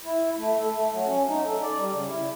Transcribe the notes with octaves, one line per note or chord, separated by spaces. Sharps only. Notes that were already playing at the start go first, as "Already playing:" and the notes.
E4
A3
A4
A3
F#3
C#4
D#4
A4
D5
G3
C#3
E4